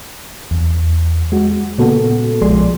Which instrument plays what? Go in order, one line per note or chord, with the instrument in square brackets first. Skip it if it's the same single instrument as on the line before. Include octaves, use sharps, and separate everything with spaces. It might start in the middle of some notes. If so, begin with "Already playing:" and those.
[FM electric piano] E2
G#3 F#4
A#2 C#3 A#3 B3 F#4 A4
B1 F3 G#3 G#4 D5 C6